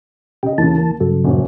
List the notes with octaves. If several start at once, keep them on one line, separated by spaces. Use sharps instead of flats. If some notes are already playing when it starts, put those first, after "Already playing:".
C#3 G4 D#5
D#2 C#3 E3 A5
A#3
G2 C#3 F#3 A4
D#1 F#2 C#5